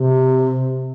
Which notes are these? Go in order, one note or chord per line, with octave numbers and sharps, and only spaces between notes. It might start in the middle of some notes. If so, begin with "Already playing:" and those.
Already playing: C3